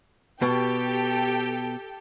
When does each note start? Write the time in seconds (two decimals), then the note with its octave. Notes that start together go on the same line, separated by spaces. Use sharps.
0.42 B2 G4 A4 G5